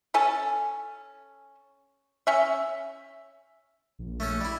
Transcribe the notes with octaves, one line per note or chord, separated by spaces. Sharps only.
C#4 A4 G#5 A5
C#4 E5
A#1
A3 C#4 A4
G3 E4